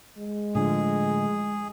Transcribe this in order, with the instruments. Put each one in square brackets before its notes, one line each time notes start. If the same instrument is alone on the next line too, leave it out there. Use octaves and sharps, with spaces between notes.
[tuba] G#3
[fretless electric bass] A2 D3 F3 [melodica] G#4